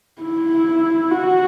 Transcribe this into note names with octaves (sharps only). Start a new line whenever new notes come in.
E4
F#4